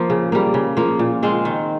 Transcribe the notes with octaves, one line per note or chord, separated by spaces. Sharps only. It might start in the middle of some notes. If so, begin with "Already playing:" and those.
Already playing: F3 A#3
C#3
G3 A#3
C#3
F3 A#3
A#2
G#3 C4 F4
D#3